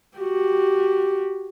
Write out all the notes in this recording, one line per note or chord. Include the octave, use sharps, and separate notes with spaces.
F#4 G4